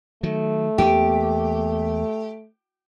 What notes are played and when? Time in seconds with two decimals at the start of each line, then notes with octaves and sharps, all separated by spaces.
0.23 D#3 F#3 A3
0.78 E2 A#3 B3 G4